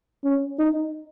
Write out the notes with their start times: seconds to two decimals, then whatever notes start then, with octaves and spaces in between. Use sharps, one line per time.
0.24 C#4
0.59 D#4